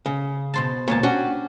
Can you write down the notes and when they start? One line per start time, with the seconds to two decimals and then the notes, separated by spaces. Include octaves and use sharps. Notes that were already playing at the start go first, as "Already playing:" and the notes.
0.06 C#3
0.54 B2 C5 A5
0.88 C#2 A#2 C#5 A5
1.03 C#4 D4 F#4 G4